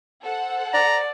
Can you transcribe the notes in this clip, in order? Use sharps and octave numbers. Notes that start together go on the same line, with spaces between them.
A4 C5 F#5
D5 A#5